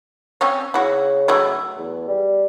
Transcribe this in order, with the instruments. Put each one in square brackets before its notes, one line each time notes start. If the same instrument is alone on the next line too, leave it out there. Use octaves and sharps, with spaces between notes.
[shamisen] C4 C#4 C#5
[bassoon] C#3 [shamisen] E4 F#4
[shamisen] F#3 A3 E4
[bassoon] E2
G3